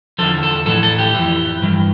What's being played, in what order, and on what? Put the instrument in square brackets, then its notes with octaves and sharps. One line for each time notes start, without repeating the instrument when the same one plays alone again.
[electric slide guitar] E2 D3 F3 A4
A4
A2 E3 A4
A4
G4
F2 E3
G2 E3